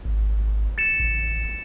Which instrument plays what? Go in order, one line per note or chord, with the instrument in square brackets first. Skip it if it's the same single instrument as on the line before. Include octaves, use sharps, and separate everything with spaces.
[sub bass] G#1
[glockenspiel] A6 C#7 E7
[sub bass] A1